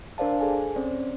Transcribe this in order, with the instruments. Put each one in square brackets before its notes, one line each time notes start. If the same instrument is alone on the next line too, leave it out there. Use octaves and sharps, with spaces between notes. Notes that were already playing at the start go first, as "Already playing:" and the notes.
[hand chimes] D4 A#4 C5 D5 F5 A5
G#4 A4 G#5
C4 C#4 C5 D5